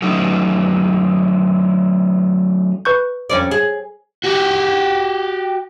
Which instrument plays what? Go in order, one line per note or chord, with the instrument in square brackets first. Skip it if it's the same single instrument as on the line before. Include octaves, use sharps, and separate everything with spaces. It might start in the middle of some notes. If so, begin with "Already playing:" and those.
[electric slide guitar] F#3 A3 C#4 D#4
[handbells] B4 C#6 G6
[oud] F2 C#4 D5
G#4
[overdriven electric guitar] F#4 G4